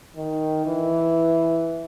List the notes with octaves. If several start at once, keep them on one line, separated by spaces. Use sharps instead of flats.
D#3
E3